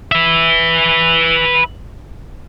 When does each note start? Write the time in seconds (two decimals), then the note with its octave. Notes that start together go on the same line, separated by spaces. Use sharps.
0.12 B4 E5